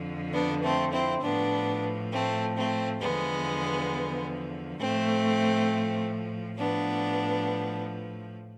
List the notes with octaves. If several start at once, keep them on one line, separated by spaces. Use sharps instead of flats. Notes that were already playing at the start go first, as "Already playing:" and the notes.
Already playing: F2 D3 F3
B3 D4
A3 C4
C4 E4
A2 F3 B3 D4
A3 C4
A3 C4
E2 D3 F3 G#3 B3
A2 F3 A3 C4
A2 F3 B3 D4